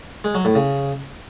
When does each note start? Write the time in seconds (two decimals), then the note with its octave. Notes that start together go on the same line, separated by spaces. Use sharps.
0.24 G#3
0.35 F#3
0.45 A2
0.55 C#3